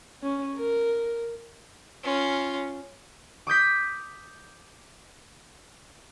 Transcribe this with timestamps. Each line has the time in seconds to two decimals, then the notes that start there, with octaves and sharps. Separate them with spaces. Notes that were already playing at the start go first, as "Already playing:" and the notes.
0.22 C#4
0.55 A#4
2.04 C#4 F4
3.47 D6 D#6 G6 B6